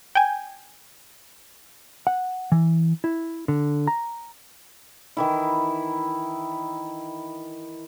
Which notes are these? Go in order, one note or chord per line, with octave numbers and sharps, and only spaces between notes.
G5 G#5
F#5
E3
E4
D3
A#5
D#3 E3 E4